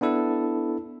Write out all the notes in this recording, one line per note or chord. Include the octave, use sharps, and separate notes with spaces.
B3 D4 E4 A4